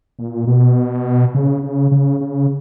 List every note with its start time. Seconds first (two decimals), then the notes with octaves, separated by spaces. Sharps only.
0.19 A#2
0.47 B2
1.34 C#3
1.63 C#3
1.91 C#3
2.21 C#3